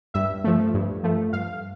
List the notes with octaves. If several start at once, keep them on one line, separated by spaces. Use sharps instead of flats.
G2 E5
F3 A3
G2
F3 A3
G2 F5